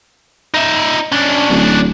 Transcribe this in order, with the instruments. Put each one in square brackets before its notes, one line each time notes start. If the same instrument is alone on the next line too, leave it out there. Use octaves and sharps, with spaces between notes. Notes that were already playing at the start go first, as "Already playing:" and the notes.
[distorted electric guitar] D#4 E5
C#4 D4
[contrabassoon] D1